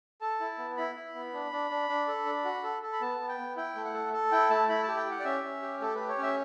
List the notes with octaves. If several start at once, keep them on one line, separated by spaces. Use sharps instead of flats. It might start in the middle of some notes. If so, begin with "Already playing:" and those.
A4 A5
E4
B3
E4 B5
E4
B3
D4
D4
D4
D4
A4
D4
F#4
A4
A4
B5
B3 A5
B3
G5
B3
E4 G5
A3
F#5
A4
A4
E4 G5
A3 A5
E4 B5
G4 A5
G5
G4 F#5
D5
C#4 E5
C#4
G4
A3 A4
G4 B4
C#5
C#4 E5